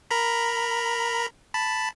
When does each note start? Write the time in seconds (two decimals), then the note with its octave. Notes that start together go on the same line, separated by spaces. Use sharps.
0.11 A#4 A#5 B5
1.54 A5 B5